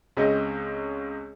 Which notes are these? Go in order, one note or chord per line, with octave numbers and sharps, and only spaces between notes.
C#2 G#3 C4 C#4 C#5 D#5